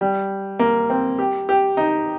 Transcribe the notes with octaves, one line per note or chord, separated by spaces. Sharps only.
G3
A#3
C4
G4
G4
D#4